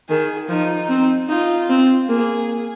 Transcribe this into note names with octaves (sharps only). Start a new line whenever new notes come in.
D#3 G#4
F3 D#4
C4
D#4 F4
C4
A#3 G#4